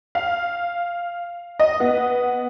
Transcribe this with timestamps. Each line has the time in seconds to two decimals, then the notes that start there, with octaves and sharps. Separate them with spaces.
0.15 F5
1.59 D#5
1.80 B3